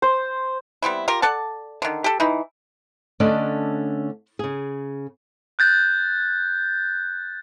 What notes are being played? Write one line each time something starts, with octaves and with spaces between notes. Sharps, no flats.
C5
G3 B3 C4 E4
F4 G4 A#4
A4 D5 F#5 A5
D3 D#3
G4 A4
E3 D#4 E4
D3 A3 C#4 D4 D5 D#5
C#3 G#4
F#6 G6 A6